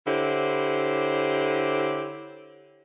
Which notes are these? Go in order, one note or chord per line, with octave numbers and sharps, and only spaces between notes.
D3 E4 G4 C5 C#5